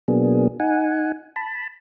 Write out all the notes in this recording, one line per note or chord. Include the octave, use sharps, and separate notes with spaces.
B2 F#3 A#3 B3 D4 G#4
D#4 F#5 G#5
A5 B5